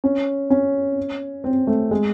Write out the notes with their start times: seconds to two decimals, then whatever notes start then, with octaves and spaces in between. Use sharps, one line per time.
0.04 C#4
0.50 C#4
1.44 C4
1.67 A3
1.91 G#3